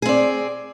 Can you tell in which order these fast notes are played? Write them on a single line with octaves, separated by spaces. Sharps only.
G#4 C4 D5